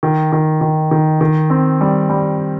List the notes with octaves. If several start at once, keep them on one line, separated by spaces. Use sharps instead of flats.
D#3
D#3
D#3
D#3
D#3
C4
G3
G3